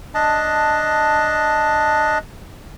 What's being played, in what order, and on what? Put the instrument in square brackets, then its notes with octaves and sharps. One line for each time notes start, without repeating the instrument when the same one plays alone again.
[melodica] D4 D#5 A5